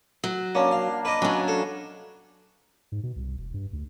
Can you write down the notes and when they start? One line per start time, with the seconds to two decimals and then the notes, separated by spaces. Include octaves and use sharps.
0.24 F#3
0.55 A#3 C#4 D4
0.71 F5
1.05 B4 D#5 D6
1.22 F#3 C#4 D4
1.48 A4
2.92 G#2
3.03 B2
3.16 C2
3.38 E1
3.54 G2
3.73 D2